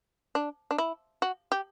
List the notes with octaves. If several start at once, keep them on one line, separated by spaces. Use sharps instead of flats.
D4
D4
E4
F#4
G4